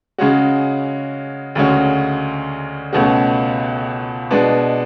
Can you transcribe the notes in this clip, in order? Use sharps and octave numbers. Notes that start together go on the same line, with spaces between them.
C#3 G#3 C#4 F#4
D2 C#3 G#3 C#4 F#4
C#2 B2 A3 C#4 F#4
B2 G#3 B3 D4